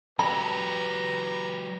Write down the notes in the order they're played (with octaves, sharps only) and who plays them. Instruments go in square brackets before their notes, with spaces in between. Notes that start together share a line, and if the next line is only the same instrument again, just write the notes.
[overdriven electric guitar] F#3 G4 [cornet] B4 [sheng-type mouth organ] A#5 [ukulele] B5